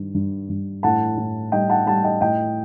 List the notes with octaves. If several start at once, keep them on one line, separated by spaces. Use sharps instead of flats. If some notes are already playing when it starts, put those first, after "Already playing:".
Already playing: G2 D#3
G2
G2
A2 F#5 A5
A2
G3 D#5 G5
F#5 A5
G3 F#5 A5
D#5 G5
A2 D#5 G5